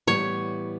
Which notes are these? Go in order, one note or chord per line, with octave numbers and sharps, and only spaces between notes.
A2 E3 G3 B3 C#5